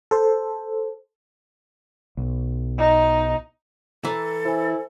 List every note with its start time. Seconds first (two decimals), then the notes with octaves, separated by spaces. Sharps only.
0.11 A4 C5
2.17 B1
2.79 D#4
4.05 E3 A4 A#5
4.45 E4 C5 G#5